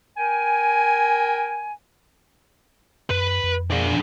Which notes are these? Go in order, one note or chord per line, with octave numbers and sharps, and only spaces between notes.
A#4 G5 G#5
F#2 B4 B5
F2
D4 G#4